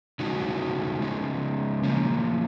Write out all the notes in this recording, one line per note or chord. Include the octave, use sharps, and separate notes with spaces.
C#3 G#3 C#4 D#4 F#4
C#3 G#3 C#4
F3 A#3 C#4